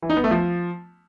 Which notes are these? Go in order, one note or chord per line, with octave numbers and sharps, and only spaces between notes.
E3
D#4
B3
A3
F3